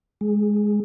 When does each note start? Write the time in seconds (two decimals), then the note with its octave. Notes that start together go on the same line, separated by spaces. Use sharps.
0.21 G#3